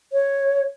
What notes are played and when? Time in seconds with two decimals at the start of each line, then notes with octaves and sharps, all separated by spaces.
0.12 C#5